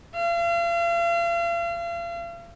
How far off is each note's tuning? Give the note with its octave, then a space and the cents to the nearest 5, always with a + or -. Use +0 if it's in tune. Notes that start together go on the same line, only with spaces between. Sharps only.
F5 -40